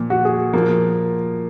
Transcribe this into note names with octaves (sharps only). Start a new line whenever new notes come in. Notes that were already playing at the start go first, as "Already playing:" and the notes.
Already playing: A#2 F3
F#4
G#4
A#2 F3 A#3